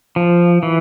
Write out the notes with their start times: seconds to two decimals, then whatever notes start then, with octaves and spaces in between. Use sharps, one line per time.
0.16 F3
0.63 E3